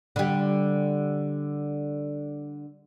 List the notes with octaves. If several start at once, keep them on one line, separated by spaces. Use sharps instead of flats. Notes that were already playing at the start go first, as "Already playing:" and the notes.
D3 G3